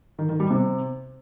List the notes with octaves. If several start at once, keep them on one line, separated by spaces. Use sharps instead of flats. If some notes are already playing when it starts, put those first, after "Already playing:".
D#3
D#3
G3
C3